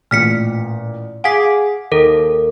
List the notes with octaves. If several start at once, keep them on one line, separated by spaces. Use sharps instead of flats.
A1 A#2 F6 B6 C#7
G#4 F5 F#5 D6 B6
D#2 A4 A#4